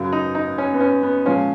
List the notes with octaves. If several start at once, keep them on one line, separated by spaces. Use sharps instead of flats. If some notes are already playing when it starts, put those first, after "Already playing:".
Already playing: F#2 C#3 F#3
D#4
D#4
C#4
B3
C#4
B3
A#2 F3 G#3 C#4